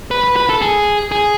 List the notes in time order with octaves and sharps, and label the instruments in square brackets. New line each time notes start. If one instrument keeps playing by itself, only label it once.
[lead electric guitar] B4
B4
B4
A4
G#4
G#4